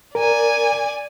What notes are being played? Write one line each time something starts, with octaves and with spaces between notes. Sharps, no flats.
A#4 D5 G#5